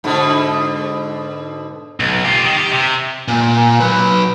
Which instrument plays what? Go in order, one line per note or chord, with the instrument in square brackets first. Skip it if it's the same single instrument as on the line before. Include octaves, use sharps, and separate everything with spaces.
[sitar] G#2 B2 D3
[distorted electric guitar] B1
F4 G4
D#3
G4
C3
[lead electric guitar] A#2
F#3 B4